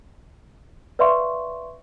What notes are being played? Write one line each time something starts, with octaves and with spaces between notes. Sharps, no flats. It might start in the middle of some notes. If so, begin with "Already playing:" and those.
B4 D5 E5 F5 C6 C#6